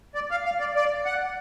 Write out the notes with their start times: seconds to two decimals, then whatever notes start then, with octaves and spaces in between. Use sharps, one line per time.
0.15 D5
0.31 F5
0.45 F5
0.60 D5
0.75 D5
1.05 F#5